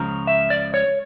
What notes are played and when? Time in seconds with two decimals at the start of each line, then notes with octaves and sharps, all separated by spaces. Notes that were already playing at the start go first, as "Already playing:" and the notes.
Already playing: C#2 C#3 F3 A#5
0.27 E5
0.50 D5
0.74 C#5